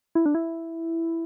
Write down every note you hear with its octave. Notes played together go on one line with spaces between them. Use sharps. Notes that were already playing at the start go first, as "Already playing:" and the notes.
E4
D4
E4